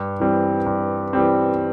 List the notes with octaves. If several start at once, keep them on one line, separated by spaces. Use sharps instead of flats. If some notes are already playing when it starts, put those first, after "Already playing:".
Already playing: G2
E3 G3 C4
G2
E3 G3 C4